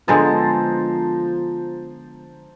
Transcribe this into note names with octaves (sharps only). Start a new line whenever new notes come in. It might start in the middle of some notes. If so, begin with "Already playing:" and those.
D3 F3 G#3 B3 C5 A5 A#5